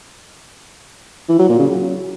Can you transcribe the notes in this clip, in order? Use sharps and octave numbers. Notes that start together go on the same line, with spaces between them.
E3
F#3
A#2
C#3
F#3